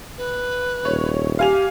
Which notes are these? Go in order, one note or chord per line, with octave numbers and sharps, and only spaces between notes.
B4
D#1 C#5
G4 F5 G#5 F7